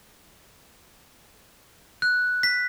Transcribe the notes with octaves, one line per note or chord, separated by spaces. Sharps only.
F#6
B6